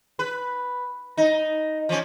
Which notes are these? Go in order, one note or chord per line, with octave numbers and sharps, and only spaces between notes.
B4
D#4
F3 C#4